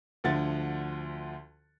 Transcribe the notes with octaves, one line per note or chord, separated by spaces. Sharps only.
D2 D3 F3 F#5 A6